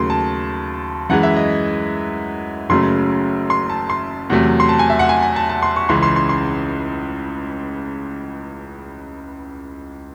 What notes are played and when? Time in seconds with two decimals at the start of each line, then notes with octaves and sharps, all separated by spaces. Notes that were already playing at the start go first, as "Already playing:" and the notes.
Already playing: D#2 C#3 F#3 A3 C6
0.10 A5
1.10 F#2 E3 G#3 F#5
1.23 E5
1.36 D#5
2.69 F#1 F#2 C#3 F#3 A3 C6
3.50 C6
3.70 A5
3.90 C6
4.30 E2 C3 F#3 A3
4.60 C6
4.69 A5
4.79 G#5
4.90 E5
4.99 F#5
5.09 G#5
5.23 G#5
5.36 A5
5.49 A5
5.63 C6
5.76 C#6
5.89 C#2 C#3 E3 C6
6.03 C6
6.16 C6
6.29 C6